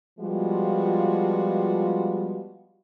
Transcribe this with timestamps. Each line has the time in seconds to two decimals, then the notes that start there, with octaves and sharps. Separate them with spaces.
0.20 F3 G3 G#3 B3 F4 F#4